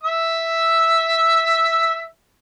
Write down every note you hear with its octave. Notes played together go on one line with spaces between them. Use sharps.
E5 E6